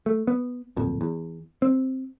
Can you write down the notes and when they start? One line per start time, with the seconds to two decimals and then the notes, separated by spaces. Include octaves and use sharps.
0.06 A3
0.27 B3
0.77 D1 A#1 F2
1.01 E2
1.62 C4